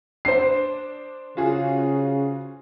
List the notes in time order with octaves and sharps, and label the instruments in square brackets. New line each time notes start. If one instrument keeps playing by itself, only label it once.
[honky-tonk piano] D4 [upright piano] C5 C7
[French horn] C#3 [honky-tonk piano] F4 F#4 G#4